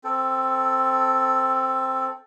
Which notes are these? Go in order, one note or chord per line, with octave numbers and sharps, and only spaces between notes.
C4 A4